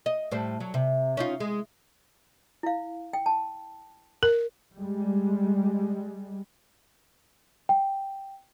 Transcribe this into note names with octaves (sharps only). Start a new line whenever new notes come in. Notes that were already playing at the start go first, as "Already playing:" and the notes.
D#5
A2 G3 C5
F#3
C3
C#4 D#4 F4
G#3
E4 F5
G5
A5
A#4
G3 G#3
G5